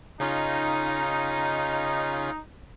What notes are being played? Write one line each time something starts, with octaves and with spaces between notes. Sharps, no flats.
C#3 C#4 D#4 F4